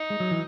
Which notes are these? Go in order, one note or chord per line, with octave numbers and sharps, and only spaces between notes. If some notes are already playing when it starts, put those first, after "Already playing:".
Already playing: D#4
G#3
F#3
E3